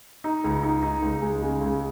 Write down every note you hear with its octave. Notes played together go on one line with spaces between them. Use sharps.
D#4
C#2
D#4
D#4
C#2
G#3
C#3
C#2